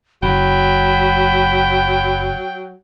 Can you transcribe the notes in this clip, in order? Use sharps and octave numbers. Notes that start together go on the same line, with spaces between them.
F#1 F#3 G5 B5